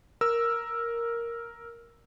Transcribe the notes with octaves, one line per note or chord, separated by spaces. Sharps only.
A#4 E6